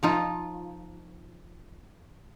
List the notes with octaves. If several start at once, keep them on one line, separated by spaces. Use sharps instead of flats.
F3 D#4 F4